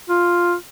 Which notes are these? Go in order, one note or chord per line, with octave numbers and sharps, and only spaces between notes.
F4